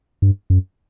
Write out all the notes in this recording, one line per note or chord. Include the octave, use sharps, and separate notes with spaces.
G2
F#2